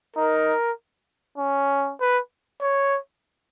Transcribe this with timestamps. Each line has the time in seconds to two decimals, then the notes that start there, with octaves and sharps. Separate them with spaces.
0.16 D#4 A#4
1.38 C#4
2.00 B4
2.61 C#5